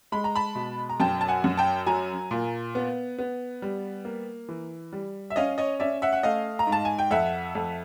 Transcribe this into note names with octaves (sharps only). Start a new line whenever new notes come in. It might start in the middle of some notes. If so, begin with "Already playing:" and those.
G#3 B5
A#5
A5 B5
B2
A#5
F#2 G5 A5
A5
F#5 G#5
F#2
G5 A5
F#3 G#5 A#5
A#2
B3
B3
G3
A#3
E3
G3
E5
C#4 D#5 F5
C#5 D#5
C#4 D5 E5
E5 F#5
F#5
A3 D#5 F5
A#5
G#2
A5
G#5
G5
F2 E5 F#5
F2